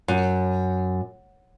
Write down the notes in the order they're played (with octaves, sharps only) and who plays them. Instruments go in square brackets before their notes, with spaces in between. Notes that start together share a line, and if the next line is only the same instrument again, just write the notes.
[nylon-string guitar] F#2